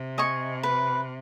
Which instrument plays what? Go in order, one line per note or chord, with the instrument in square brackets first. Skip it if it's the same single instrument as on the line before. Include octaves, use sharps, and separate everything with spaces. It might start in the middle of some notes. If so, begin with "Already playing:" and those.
Already playing: [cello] C3
[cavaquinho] D#5 G#5 C#6
B4